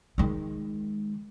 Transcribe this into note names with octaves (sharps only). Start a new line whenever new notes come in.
D#3 G#3